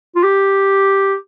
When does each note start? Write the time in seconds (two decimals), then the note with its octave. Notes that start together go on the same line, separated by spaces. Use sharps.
0.15 F4
0.24 G4